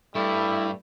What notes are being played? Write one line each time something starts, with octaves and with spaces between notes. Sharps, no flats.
G2 G3 A3 E4